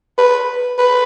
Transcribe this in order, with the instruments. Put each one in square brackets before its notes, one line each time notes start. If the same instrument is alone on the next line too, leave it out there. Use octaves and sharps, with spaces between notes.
[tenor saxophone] B4
B4